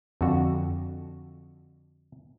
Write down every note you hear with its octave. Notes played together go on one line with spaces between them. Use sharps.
F2 D3 F#4